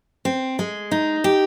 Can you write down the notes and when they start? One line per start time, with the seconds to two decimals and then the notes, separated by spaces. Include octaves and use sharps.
0.25 C4
0.59 G#3
0.91 D#4
1.24 G4